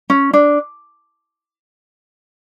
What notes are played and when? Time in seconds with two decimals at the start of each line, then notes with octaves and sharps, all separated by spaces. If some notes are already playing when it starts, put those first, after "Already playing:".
0.10 C#4
0.33 D4